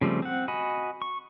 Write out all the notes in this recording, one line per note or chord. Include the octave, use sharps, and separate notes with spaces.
C#3 F3 G3 A3 C4
C4 F#5
F#4 D#5 G#5 B5
C#6